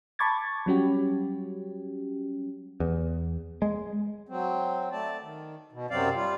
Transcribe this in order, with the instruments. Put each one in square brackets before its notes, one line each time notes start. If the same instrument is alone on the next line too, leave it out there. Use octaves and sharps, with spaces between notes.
[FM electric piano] A5 B5 C#6 D6 G#6 A6
F#3 G3 C#4 F#4 G4
[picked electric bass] E2
G#3
[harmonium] F#3 C4
A3 D5 A5
D#3
B2
F#2 C3 F#3 C4 D5 F5
G3 F4